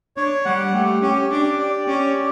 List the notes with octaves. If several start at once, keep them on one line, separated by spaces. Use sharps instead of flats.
D4 C#5
G3 F#5
A3 G4
C#4 G4
D4 G4
D5
C#4 G4
G4